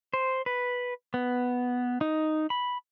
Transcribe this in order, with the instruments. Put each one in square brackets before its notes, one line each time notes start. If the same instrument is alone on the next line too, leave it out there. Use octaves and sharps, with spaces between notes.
[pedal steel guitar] C5
B4
B3
D#4
B5